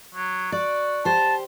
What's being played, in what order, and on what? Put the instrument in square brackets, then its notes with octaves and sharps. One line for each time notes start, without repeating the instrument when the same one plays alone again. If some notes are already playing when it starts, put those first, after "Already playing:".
[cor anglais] F#3
[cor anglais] F#4 [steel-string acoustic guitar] D5
[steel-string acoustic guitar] G4 C5 [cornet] A5